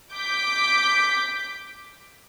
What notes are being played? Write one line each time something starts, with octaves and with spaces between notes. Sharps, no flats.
D6 G6 B6